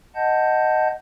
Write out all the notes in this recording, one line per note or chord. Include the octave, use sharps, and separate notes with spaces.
D#5 F#5 A5 G6